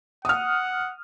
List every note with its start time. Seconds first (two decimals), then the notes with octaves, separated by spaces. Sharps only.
0.25 F#5 D#6 F6